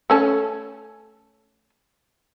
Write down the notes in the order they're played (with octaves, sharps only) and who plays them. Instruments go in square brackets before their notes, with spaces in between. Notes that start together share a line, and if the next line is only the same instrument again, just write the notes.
[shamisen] A3 C#4 A4